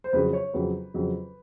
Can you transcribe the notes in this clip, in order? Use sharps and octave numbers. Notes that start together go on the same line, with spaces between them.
C5
F2 C#3 F#3 B4
C#5
F2 C#3 F#3 B4
F2 C#3 F#3